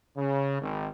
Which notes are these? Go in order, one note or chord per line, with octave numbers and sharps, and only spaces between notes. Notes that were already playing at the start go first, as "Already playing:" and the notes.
C#3
G#1